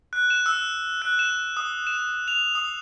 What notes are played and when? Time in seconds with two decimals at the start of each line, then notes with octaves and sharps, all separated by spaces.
0.13 F#6
0.30 E7
0.46 E6
1.02 F#6
1.19 E7
1.57 D#6
1.87 E7
2.28 F7
2.55 D#6